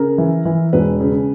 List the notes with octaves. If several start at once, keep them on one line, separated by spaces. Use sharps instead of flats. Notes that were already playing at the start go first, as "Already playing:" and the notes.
Already playing: C#3 A#4
E3
E3
E1 B4
C#3